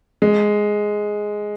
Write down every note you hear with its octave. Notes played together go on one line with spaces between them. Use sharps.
G#3